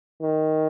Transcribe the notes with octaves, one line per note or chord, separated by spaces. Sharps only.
D#3